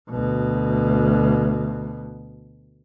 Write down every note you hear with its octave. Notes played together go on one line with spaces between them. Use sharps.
D2 B2